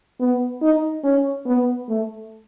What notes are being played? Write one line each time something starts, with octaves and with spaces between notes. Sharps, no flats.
B3
D#4
C#4
B3
A3